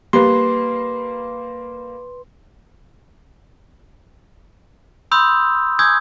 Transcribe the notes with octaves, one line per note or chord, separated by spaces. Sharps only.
G3 A#3 B4 C6
B5 C6 D#6 E6 G6
G#5 C#6 D#6 E6 G6 G#6